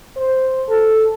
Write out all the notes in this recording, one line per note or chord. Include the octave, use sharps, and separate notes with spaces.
C5
A4